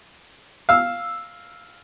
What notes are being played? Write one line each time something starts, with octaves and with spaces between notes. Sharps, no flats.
F5 E6